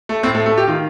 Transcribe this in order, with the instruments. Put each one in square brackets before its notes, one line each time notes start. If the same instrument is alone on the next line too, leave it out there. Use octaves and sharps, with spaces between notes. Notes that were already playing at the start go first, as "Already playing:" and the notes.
[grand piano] A3
A2 C4
A3
A3
G4
D#3 F4